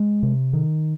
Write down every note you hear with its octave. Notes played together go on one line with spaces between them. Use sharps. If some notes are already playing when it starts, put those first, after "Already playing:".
Already playing: G#3
C3
D#3